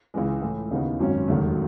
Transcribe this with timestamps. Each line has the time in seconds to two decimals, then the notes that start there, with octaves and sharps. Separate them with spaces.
0.14 C#2 C#3 E3 G#3
0.42 A2 E3 A3
0.71 D#2 C#3 E3 B3 D#4
0.99 G#1 F#2 D#3 F#3 C#4
1.28 E1 D#2 D#3 F#3 A3